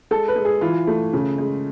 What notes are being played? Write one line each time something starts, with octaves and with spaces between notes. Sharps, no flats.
G#3 A4
B4
G#3
G#4
E3 F4
A3
C#3
G#3